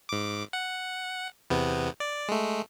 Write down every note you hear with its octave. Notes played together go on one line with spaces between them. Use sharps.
G#2 D6
F#5
E2 C3 B3
D5
G#3 A3